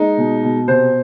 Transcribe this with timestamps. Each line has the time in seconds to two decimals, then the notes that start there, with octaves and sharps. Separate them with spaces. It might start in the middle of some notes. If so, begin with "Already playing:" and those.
Already playing: G#3 D#4
0.17 B2
0.43 B2
0.68 C3 C5